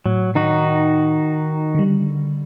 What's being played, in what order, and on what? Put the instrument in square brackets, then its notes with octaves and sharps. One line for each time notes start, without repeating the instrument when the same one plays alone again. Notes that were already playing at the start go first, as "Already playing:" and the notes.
[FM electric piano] A2 [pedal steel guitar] F#3
[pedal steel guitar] D#3 D#4 F#4
[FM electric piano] D3 G3